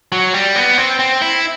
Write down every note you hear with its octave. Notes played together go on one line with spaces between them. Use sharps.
F#3
G3
B3
C4
C4
E4